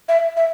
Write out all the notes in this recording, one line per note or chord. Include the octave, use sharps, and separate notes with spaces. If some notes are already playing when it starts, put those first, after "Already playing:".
E5
E5